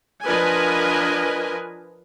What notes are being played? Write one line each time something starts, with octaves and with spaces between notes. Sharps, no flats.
F3 D4 A#4 B4 D#5 G#5